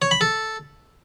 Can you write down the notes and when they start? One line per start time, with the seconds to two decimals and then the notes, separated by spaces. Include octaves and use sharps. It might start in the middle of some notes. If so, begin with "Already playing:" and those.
0.02 C#5
0.11 B5
0.21 A4